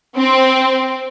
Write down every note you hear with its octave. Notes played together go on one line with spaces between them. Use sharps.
C4